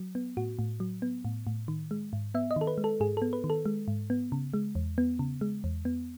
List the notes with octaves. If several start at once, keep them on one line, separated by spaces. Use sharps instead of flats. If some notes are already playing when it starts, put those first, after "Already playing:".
Already playing: F#3
B3
A2 F#4
A2
F#3
B3
A2
A2
D#3
G#3
G#2
B3 E5
D#5
D#3 A4
B4
G#3
A4
G#2 G#4
B3 A4
B4
D#3
A4
G#3
G#2
B3
C#3
G#3
E2
B3
C#3
G#3
E2
B3